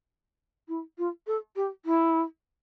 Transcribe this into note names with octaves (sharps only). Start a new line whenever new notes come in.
E4
F4
A4
G4
E4